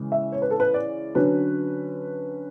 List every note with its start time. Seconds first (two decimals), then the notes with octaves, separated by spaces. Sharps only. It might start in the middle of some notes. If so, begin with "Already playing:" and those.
Already playing: C#3 E3 G#3
0.12 E5
0.32 C#5
0.42 B4
0.51 A4
0.60 B4
0.74 D5
1.15 D3 F#3 C#4 B4